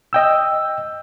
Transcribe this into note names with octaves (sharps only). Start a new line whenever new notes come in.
D#5 G5 E6